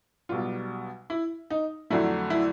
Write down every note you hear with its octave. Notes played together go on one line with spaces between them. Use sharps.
B1 B2 G3 F4
E4
D#4
F2 D3 F#3 A3 E4
E4